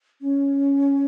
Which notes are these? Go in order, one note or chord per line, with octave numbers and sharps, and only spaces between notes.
C#4